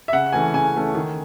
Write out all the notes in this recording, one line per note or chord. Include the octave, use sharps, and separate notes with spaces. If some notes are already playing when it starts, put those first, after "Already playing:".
E5
C#3 F#5
E3 A3 C#4 G#5
C#3 G#5
E3 A3 C#4
D#3